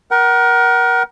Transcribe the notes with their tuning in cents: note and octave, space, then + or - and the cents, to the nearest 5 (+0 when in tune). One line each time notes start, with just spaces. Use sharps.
A#4 +25 F#5 +35